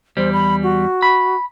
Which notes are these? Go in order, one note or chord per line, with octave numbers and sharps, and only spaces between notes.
E2 G3 C5
B5
F#4
B5